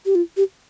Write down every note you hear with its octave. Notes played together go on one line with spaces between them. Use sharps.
G4
F4
G4